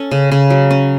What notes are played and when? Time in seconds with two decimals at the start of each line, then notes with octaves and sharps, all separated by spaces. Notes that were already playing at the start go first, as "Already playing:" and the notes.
Already playing: C#4 A4
0.11 C#3
0.32 C#3
0.50 F#3
0.71 C#4